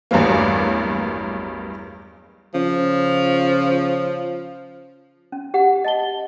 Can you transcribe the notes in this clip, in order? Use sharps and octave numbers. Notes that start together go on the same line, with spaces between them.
A1 E2 G2 F#3 A#3
C#3 F3
C#4
G4 F#5
D#5 A5 G7